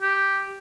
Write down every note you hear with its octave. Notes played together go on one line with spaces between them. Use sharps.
G4